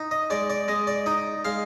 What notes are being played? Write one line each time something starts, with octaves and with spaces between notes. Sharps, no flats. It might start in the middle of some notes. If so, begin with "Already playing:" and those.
Already playing: D#4
D#5
G#3 D5
D5
G#3 D#5
D5
D#4 D#5
G#3 F5